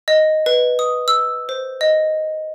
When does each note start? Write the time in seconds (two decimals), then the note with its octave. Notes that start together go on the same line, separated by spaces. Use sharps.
0.08 D#5
0.46 B4
0.79 D#6
1.08 E6
1.49 C5
1.81 D#5